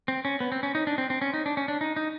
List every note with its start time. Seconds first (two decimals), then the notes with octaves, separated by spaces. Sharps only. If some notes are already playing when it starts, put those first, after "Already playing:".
0.08 C4
0.25 C#4
0.40 B3
0.52 C4
0.63 C#4
0.75 D#4
0.87 D4
0.98 C4
1.10 C4
1.22 C#4
1.34 D#4
1.46 D4
1.57 C#4
1.68 D4
1.81 D#4
1.96 D#4